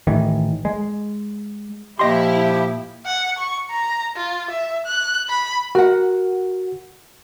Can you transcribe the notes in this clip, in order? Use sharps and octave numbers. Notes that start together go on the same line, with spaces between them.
A1 A2 D#3 E3
G#3
A#2 F3 E4 G4 D#5 C6
F#5
C#6
A#5
F4
E5
F#6
B5
F#4 A#4 F#5